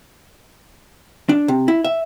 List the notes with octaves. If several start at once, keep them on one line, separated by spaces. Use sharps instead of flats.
D4
C3
E4
E5